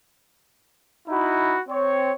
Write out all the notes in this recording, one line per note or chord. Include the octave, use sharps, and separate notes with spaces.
D#4 E4 F#4 B5
C4 C#5